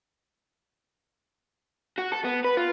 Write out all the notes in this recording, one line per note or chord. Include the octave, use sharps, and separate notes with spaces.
F#4
A4
B3
B4
F4